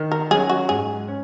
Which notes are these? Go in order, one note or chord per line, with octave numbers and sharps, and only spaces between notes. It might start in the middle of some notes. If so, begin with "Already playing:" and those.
Already playing: D#3
A#4
F#3 C#4 G#4
F#4
G#2 G#4
C#4